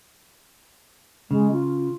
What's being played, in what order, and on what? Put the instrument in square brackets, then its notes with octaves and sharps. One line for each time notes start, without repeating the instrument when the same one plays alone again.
[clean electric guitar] C#3 [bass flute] G#3
[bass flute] F4